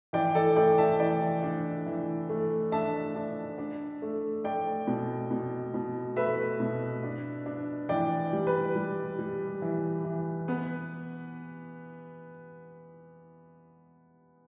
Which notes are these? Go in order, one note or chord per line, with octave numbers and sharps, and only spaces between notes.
E3 D5 G5
A4 D5
A3 D5 G5
E5 A5
E3 D5 G5
D4
E3
A3
D4 E5 A5
D4
D4
A3
A3 D5 G5
B2
B2
B2
A3 B4 E5
B2
D4
D4
E3 D5 G5
G3
B4
G3
G3
E3
E3
B3 B4